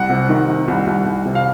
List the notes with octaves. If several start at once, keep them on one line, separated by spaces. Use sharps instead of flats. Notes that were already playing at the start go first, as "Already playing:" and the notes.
Already playing: C2 F#5
C3
D#3
D#3
C2
C2
C2
C3
F5